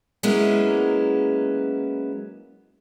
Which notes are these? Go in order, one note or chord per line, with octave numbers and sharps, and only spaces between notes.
F#3 G#3 A#3 B3 C#4 E4